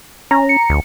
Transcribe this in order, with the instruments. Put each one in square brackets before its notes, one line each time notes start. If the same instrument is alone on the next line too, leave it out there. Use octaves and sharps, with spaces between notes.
[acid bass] C#4 [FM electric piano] A#5
[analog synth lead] C#7
[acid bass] D2